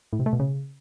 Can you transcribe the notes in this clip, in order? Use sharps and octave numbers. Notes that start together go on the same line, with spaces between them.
A2
C3
A3
B2
C#3